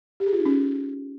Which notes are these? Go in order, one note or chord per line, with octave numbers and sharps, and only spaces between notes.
G4
G#4
F4
D#4
C#4